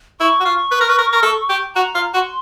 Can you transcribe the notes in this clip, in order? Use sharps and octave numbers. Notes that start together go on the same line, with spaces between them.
E4 C#6
F#4
F4
B4
A#4
B4
A#4
A#4
A4
G4
F#4 A#5
F4
F#4 C6